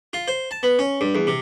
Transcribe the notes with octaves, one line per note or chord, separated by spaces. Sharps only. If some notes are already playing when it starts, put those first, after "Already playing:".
F4
C5
A5
B3
C#4
G2
E2
C3